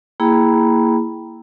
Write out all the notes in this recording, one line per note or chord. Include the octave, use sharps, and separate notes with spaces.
A#3 E4 G#4 G5 A#5 B5